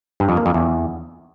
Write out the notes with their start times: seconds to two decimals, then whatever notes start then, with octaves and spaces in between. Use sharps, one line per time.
0.20 G2
0.29 F2
0.37 A#3
0.46 F2
0.54 E2